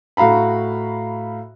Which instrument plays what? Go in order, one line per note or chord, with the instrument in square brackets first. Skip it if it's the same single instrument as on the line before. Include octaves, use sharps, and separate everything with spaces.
[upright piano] A2 F#4 F5 A#5 B5